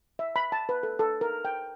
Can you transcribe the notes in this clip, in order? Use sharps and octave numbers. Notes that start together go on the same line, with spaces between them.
E5
B5
A5
B4
A4
A4
A#4
G5